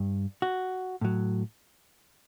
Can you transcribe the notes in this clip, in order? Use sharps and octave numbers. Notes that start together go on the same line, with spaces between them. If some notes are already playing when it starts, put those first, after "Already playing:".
Already playing: G2
F#4
A2 F#3